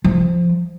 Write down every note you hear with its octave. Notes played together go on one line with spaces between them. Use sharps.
F3